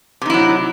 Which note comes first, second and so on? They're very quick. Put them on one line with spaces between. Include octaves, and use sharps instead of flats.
C3 D#4 E4 F#3